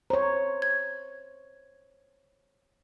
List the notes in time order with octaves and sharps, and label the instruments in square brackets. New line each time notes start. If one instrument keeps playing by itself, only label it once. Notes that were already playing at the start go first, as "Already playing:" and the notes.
[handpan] C5 C#5 [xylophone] A#5
[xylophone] G#6